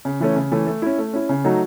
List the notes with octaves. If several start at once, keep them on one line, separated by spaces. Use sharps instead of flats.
C#3
E3 A3 C#4
C#3
E3 A3 C#4
A3
C#4 E4
A3
C#4 E4
C#3
F#3 A3 D#4 F#4